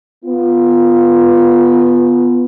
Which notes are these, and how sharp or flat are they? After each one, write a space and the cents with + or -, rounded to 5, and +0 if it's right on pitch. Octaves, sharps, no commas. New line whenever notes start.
B3 +0 F4 +0